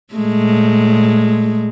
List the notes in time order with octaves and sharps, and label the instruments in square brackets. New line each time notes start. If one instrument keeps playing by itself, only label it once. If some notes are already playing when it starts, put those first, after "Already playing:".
[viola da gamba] A#2 G#3 A3